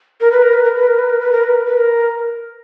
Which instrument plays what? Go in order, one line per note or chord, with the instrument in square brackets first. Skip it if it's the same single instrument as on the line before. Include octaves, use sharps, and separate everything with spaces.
[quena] A#4
B4
A#4
B4
A#4
B4
A#4
B4
A#4
B4
A#4
B4
A#4
B4
A#4